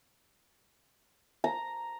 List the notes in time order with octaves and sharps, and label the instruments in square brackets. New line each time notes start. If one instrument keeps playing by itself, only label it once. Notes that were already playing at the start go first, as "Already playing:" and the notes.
[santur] A#5